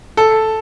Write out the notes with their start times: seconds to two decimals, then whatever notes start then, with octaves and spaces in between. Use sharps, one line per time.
0.17 A4